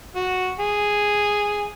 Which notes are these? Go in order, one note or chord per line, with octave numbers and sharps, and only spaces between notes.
F#4
G#4